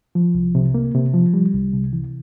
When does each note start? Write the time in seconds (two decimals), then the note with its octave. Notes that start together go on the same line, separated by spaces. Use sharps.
0.15 F3
0.35 C2
0.55 C3
0.74 A#3
0.94 C3
1.14 F3
1.34 G3
1.54 C2
1.73 C3
1.93 E3